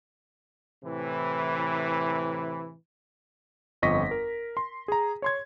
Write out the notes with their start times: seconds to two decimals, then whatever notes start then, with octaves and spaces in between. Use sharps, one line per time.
0.84 A2 C3 E3
3.82 G1 F2 D#5 C#6 A#6 B6
4.11 A#4
4.57 C6
4.88 G#4 A#5
5.22 C#5 C6 G#6